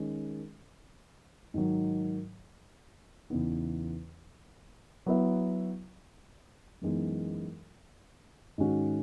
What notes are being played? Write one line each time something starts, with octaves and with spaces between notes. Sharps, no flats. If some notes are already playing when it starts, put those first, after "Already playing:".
Already playing: D#3 G#3 C#4
G#2 D#3 F#3
E2 C#3 E3 B3 D#4
F#3 B3 E4 B4 E5
F#2 E3 G#3 B3 D#4
G#2 D#3 G#3 C#4 F#4